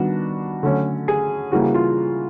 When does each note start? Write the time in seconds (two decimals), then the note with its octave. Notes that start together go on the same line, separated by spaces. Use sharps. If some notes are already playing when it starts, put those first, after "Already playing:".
Already playing: D#3 G3 B3 D4 F#4
0.63 D3 F#3 A3 C#4
1.08 G#4
1.52 C#3 E3 G3 A#3 F#4
1.74 F4